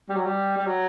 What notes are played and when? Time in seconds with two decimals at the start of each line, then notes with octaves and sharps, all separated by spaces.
0.09 G3
0.16 F#3
0.26 G3
0.57 G3
0.67 F#3